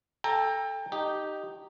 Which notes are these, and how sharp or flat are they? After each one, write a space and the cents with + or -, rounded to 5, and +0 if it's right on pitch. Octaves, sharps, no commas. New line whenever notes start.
A4 +0 G5 +30 A#5 +0
D#4 -10 G4 -10